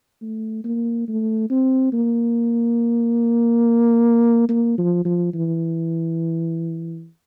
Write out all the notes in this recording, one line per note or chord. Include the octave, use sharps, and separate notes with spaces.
A3
A#3
A3
C4
A#3
A#3
F3
F3
E3